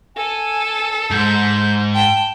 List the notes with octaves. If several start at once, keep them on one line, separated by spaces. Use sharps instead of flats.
A4 G#5
G#2 G6
G5 A5